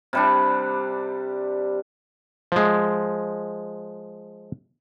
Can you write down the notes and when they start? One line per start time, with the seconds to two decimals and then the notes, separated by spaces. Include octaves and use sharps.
0.13 C3 G3 D4
2.52 F3 G#3